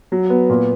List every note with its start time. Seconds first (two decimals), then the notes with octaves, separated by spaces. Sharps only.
0.12 F#3
0.30 B3
0.50 A#2